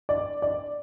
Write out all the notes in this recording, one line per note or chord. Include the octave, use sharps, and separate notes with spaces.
D5
D5